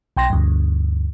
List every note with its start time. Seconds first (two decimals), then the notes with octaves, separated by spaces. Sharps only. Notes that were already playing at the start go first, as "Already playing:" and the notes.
0.17 B1 G5 C6 A#6
0.30 D2 G2